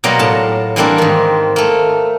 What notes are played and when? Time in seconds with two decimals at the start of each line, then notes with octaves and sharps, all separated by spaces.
0.04 B2 F#3 G3 A#3 F4 A#4
0.19 A2 A5
0.76 E3 G3 A#3 C4 D4
0.98 G#2 D#3
1.56 A3 A#3